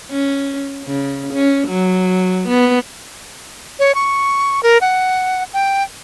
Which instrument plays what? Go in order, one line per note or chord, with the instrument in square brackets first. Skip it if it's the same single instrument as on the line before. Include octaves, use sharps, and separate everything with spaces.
[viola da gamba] C#4
C#3
C#4
F#3
B3
[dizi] C#5
C#6
A#4
F#5
G5